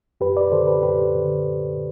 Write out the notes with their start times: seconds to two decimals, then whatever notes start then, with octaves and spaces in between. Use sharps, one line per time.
0.20 F#2 G4 B4
0.37 B4 D5
0.52 D3 A4 C5
0.67 G4 B4
0.83 F#2 G4 B4
1.15 D3
1.45 F#2